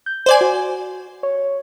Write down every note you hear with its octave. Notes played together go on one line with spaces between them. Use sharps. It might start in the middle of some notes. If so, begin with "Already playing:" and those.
G6
C5 D5 G#5
F#4
C#5